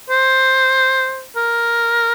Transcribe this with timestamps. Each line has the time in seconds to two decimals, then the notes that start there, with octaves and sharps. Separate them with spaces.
0.10 C5
1.36 A#4